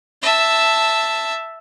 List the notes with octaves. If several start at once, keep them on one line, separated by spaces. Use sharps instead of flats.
E5 A5